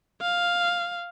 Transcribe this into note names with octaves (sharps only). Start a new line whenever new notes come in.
F5